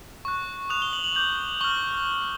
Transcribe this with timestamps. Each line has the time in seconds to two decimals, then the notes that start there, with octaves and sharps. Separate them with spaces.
0.25 C#6 F#6
0.70 D#6 F#6 F7
0.82 G7
0.93 F#7
1.04 F#7
1.15 D6 G6 F#7
1.61 C#6 F6 G7